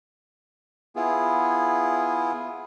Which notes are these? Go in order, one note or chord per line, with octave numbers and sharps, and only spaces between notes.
B3 E4 F4 G#4